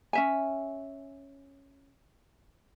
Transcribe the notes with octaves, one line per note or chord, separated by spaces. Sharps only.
C#4 E5 G#5